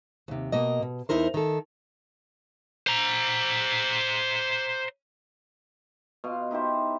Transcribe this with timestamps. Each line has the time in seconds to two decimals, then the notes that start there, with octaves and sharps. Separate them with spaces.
0.28 D#2 C3
0.52 B2 A#3 D#5
0.82 B2
1.09 E2 C3 D#4 E4 A#4 C5
1.34 D#3 A4
2.87 C5 A#5
6.24 B2 F5 C6
6.51 D#4 E4 G4 C5